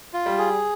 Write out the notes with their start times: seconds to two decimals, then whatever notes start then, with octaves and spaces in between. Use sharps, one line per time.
0.13 F4
0.26 G3
0.38 G#4